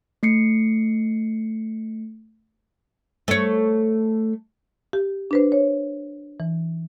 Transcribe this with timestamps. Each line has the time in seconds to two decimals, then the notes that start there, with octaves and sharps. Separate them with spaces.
0.23 A3 C7 C#7
3.28 A3 C#5
4.93 G4
5.31 D4 B4 C5
5.52 C#5
6.40 E3